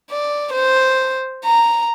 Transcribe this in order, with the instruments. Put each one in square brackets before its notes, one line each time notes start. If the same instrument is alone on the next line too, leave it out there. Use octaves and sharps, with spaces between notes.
[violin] D5
C5
A#5